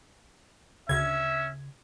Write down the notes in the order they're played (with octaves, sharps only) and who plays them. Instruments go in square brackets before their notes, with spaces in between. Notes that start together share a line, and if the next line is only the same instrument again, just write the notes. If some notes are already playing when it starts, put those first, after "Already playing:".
[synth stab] D2 G#6 [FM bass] C#3 [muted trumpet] C#4 [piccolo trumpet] E5